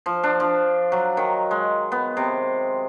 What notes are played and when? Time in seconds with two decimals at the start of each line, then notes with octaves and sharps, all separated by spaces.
0.06 F3
0.23 D4
0.40 F3
0.92 F#3
1.17 D#3
1.51 G#3
1.92 B3
2.17 C3